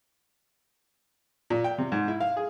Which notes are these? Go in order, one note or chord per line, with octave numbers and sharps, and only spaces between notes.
A#2
G5
C3
G#2
E4
F5
G#4